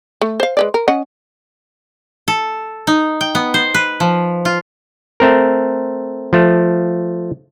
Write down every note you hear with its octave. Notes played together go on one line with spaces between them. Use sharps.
A3
C5 F5
G#3 B4 D5
A#4
C#4 D#5 F#5
A4
D#4
G5
B3
C5
B4
F3
F4
A3 C4 A#4
F3 A3